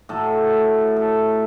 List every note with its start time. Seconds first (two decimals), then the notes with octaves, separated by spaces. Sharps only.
0.09 A2 F#3 A4
0.97 A4